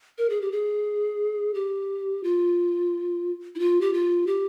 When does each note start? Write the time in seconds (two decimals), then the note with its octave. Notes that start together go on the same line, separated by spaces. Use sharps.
0.18 A#4
0.30 G#4
0.42 G4
0.52 G#4
1.54 G4
2.24 F4
3.55 E4
3.59 F4
3.81 G4
3.94 F4
4.27 G4